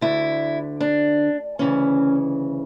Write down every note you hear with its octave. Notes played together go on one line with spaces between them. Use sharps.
D2 D3 E4
D4
D2 C#3 E3 C#4